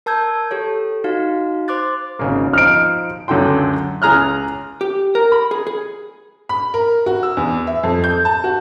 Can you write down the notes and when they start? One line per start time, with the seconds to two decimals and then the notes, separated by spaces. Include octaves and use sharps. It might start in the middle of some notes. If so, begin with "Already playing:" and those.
0.06 A#4 A5 E6 G6 G#6
0.51 G4 A4 C#5
1.04 D#4 F#4 F5
1.68 C5 C6 D6 F#6 A6
2.19 G#1 C#3 A#3
2.53 F3 D#4 C5 F6 D7
3.28 C#2 F#2 D3 A4 G5 C6
4.02 C#2 G#4 A#5 F6 F#6
4.81 G4
5.15 A#4
5.32 B5
5.51 G#4
5.67 G#4
6.49 B5
6.74 A#4
7.06 F#4
7.23 E6
7.37 E2
7.67 E5
7.84 F2
8.04 G6
8.25 A5
8.44 F#4